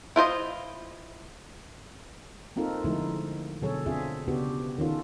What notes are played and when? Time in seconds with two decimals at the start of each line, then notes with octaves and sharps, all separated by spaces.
0.16 E4 F4 C5 D#5
2.56 A#3 C4 D#4 F4 A4 A#4
2.84 D3 F3 G#3 A3 D#4 E4
3.62 B2 D3 F#3 G#4 A4 C#5
3.86 C4 D4 F4 G#4 E5
4.28 C#3 B3 D4 F#4 G4
4.78 D#3 C#4 F4 A4